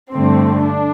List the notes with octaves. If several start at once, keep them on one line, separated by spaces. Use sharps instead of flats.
G2 D3 A3 C4
D4